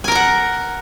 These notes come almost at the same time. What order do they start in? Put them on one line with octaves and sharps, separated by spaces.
G#5 A#4 A#5 F#5